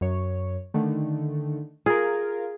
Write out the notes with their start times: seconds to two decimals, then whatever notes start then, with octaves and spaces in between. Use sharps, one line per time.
0.01 F#2 C#5
0.74 D3 D#3 A3
1.86 F4 G#4 A#4